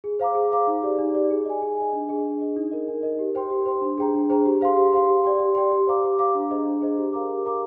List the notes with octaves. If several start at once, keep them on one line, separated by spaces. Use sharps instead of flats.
G#4
C5 F5 A#5 D6
G#4
C5 F5 A#5 D6
D#4
G4 D5
D#4
G4 D5
G#4
D#5 G#5
G#4
D#5 G#5
D4
G#4 D#5
D4
G#4 D#5
D#4
A#4 D#5
D#4
A#4 D#5
G4
C5 G5 C6
G4
C5 G5 C6
D4
G#4 C5 G5 A#5
D4
G#4 C5 G5 A#5
G4
C5 F5 C6
G4
C5 F5 C6
G4
D5 G5 C6
G4
D5 G5 C6
G4
C5 F5 A#5 D6
G4
C5 F5 A#5 D6
D4
G#4 C5 D#5 A#5
D4
G#4 C5 D#5 A#5
G4
A#4 F5 A#5 D6
G4
A#4 F5 A#5 D6